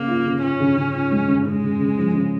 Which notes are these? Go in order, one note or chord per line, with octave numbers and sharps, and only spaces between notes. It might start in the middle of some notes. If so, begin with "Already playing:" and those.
Already playing: C#3 A#3
F4
C#3
C#4 F4
C#3
C#3
F4
G#3
C#3
C#3 G#3
C#3
C#3
F3
C#3